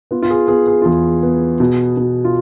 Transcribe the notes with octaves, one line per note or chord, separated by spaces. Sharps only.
B3 F4
F4
G#4
B3 G#4
G#4
F4
E2 G#4
B3
B2
B2
F4